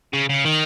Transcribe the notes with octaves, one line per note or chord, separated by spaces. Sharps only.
C#3
C#3
D#3